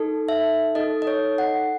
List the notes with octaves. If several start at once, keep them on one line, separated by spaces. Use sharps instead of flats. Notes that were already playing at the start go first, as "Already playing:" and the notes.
Already playing: D#4 A4
E5
D#4 A4 D#5
D#5
C#5
F#5